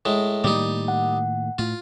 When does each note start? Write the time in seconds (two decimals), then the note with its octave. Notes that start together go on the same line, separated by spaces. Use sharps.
0.05 A2 G#3
0.44 A2 D#3 G3 A#3 D#4
0.88 F#5
1.58 A2 F4